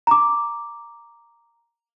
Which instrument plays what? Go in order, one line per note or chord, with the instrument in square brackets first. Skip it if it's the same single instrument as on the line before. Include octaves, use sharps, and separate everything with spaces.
[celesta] A#5 D6